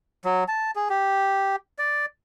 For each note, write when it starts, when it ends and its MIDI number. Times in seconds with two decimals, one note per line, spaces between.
0.25 0.44 54
0.48 0.71 81
0.76 0.88 68
0.90 1.56 67
1.78 2.06 74